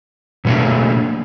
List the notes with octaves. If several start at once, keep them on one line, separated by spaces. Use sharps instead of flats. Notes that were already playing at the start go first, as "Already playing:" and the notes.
B2 F#3 A3 A#3 D4